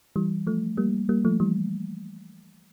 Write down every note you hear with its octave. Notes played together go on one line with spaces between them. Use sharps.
E3 G3
F3 A3
G3 A#3
G3 A#3
F3 A3
E3 G3